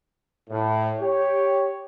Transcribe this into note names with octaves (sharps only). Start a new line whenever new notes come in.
A2
G4 C#5